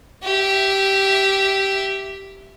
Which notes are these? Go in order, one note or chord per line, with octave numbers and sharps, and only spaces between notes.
G4 E5